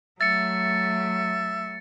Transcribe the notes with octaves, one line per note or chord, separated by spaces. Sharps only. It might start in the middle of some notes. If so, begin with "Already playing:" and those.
F#3 A3 E5 A6 C#7